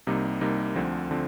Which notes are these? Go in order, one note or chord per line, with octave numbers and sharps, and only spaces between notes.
C2 C3 G3 A#3 D#4
C2 C3 G3 A#3 D#4
D2 D3 F3 C4
D3 F3 C4